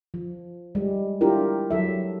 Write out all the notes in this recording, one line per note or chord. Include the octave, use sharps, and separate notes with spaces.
F3
G3 G#3
D4 E4 F4 G4 A#4
F#3 A4 E5